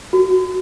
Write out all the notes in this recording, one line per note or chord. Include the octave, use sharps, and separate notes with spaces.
F#4